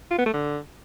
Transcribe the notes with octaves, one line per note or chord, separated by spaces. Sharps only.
F4
B3
A3
D3